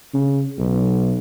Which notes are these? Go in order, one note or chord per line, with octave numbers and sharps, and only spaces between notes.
C#3
B1